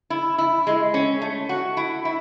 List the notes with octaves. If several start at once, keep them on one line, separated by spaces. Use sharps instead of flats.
E4
E4
G#3
C#4
A3
F#4
E4
E4